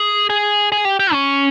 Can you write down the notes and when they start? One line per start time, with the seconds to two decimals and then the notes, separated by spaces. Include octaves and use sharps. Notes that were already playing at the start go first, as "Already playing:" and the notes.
Already playing: G#4
0.30 G#4
0.72 G#4
0.85 G4
1.00 G4
1.13 C#4